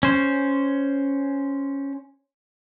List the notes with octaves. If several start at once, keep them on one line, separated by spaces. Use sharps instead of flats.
C#4 C5